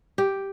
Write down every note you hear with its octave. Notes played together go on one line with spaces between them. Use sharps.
G4